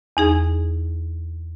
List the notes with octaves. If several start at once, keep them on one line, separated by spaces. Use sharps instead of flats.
E2 D#4 G#4